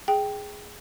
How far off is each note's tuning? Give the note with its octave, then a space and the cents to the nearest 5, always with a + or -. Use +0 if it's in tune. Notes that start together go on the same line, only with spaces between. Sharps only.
G#4 +0 G5 +0